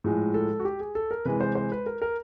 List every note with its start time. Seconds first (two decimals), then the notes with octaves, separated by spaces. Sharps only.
0.04 A2 F3 G#3 G#4
0.34 A4
0.60 F#4
0.65 G4
0.80 G#4
0.95 A4
1.11 A#4
1.25 C3 E3 G#3 B4
1.41 C5
1.55 C5
1.72 B4
1.86 A#4
2.02 A#4